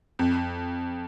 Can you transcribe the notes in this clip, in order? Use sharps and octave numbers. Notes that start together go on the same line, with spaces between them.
F2